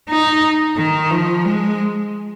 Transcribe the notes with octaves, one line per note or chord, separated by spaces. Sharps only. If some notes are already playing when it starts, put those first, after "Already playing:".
D#4
D#3
F3
G#3